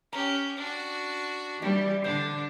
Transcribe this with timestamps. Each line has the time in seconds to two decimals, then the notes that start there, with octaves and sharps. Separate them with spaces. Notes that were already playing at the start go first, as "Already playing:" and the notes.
0.13 C#4 G4 A#5
0.56 D4 F#4
1.62 E3 G3 D4 G4
2.04 D3 D4 C5